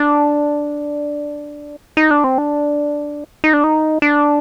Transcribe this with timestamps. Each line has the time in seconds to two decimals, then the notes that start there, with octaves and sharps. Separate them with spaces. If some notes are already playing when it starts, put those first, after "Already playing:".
Already playing: D4
1.97 D#4
2.11 D4
2.24 C4
2.38 D4
3.44 D#4
3.53 D4
3.64 D#4
4.02 D4